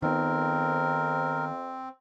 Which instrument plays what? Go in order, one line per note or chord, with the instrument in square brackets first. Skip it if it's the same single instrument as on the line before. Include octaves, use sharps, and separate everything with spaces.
[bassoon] F2 [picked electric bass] D#3 B3 [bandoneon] C4 [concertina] A#4